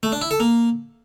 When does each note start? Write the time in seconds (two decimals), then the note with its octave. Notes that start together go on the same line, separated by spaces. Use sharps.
0.03 A3
0.12 D4
0.22 E4
0.31 A4
0.40 A#3